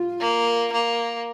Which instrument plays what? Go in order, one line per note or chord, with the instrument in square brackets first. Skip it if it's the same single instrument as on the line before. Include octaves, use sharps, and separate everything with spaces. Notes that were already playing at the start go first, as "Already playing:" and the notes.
Already playing: [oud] F4
[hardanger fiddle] A#3
A#3